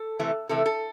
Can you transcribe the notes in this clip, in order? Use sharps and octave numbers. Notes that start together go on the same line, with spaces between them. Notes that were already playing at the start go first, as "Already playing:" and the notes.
Already playing: A4
C3 E3 A3
C3 E3 A3 A4
A4